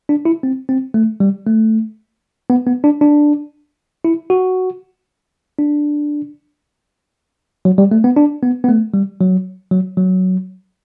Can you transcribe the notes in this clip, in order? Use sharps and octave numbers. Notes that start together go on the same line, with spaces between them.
D4
E4
C4
C4
A3
G3
A3
B3
B3
D4
D4
E4
F#4
D4
F#3
G3
A3
B3
D4
B3
B3
A3
G3
F#3
F#3
F#3